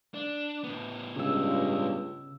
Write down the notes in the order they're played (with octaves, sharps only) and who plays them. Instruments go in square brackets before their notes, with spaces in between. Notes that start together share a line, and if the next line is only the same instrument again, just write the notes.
[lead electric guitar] D4
A2 B3
[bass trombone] C#2 [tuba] G2 [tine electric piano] C#3 E6